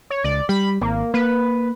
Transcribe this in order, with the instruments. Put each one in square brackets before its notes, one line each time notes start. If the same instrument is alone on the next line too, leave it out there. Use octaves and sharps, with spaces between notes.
[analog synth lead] C#5
[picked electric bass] C#2 [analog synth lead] D5
[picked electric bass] G3 [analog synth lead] B5
[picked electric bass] G#1 [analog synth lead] A#3
[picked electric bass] A#3 [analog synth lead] B4